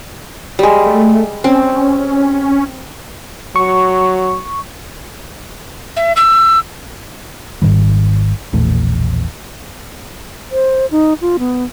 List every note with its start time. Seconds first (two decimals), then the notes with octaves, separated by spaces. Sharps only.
0.59 G3 G#3
0.86 A3
1.44 C4 C#4
3.56 F#3 C#6
5.96 E5
6.16 E6
7.62 G#1 G#2 D#3 G3
8.53 E1 A#1 E2 A3
10.51 C5
10.91 D#4
11.21 F4
11.39 B3